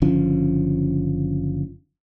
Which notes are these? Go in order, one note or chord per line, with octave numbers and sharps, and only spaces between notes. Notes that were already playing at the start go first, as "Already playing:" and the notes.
F#1 D3 F3 C#4